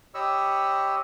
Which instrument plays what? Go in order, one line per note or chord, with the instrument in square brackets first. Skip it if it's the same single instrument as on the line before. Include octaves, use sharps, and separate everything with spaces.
[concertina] G4 C#5 D#5 B5 C#6 E6